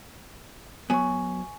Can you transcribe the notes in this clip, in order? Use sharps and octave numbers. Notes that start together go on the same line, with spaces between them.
F#3 B3 G#5 C#6